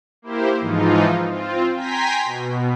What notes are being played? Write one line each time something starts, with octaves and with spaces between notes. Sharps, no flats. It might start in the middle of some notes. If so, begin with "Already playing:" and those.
A#3 E4 G4 C5
G#2 E3 F3 D#4 F4
C4 F4
G5 G#5 A#5 C6 B6
B2